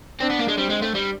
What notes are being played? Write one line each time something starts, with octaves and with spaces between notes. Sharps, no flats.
C4 D4
B3
A#3
G#3
G3 C4
G#3
A3
G3